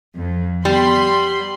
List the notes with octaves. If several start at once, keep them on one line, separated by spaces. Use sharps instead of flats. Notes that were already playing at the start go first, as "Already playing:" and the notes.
F2
G3 B3 B5 C6